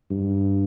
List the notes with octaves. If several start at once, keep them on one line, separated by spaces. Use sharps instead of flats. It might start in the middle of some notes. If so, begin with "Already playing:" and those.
G2